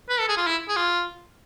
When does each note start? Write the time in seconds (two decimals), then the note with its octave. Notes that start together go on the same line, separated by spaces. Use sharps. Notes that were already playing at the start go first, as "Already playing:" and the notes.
0.09 B4
0.19 A4
0.28 G#4
0.37 F4
0.47 E4
0.68 G#4
0.76 F4